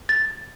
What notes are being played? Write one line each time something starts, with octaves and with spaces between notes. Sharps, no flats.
A6